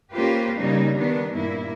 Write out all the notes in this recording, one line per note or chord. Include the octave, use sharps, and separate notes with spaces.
A#3 C#4 F4 G4 B4 C5
C#3 G3 A#3 D#4
D#3 B3 D4
G2 A#2 A#3 E4